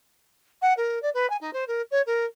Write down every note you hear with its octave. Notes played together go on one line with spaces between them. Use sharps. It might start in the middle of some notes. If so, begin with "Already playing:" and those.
F#5
A#4
D5
B4
G#5
D#4
C5
A#4
C#5
A#4